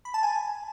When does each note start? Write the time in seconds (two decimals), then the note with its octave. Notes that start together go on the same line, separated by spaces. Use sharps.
0.05 B5
0.14 A5
0.23 G#5